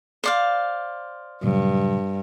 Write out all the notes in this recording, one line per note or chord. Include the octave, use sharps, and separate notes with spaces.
C5 D5 F5
G2 A#2 C#3 F#3